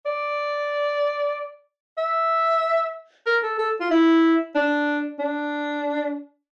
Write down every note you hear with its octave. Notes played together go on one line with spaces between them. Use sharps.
D5
E5
A#4
A4
A4
F4
E4
D4
D4